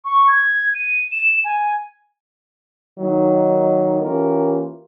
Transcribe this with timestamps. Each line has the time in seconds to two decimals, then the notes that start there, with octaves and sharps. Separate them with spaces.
0.05 C#6
0.28 G#6
0.74 D#7
1.11 E7
1.44 G#5
2.99 D#3 F#3 A#3 D#4
4.01 E3 A#3 C#4 F4 G4 A#4